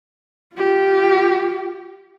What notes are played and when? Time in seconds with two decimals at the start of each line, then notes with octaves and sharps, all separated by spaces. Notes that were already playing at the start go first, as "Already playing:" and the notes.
0.55 F4 G4